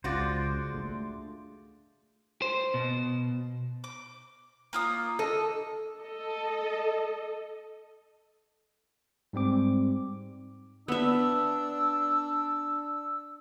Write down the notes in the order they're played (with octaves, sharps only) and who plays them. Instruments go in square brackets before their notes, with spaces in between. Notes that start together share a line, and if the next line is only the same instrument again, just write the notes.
[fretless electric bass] C#2 [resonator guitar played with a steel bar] G#3 F4 F#4 [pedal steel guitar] C5 D5
[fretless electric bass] A3 D4
[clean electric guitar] C5
B2
[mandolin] D6
A#3 F4 D#6
[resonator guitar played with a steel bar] A4 [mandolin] D#5
[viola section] A4 D#5
[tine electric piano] G#2 G3 C4 D6
[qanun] B3 E5 [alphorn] D4 [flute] E6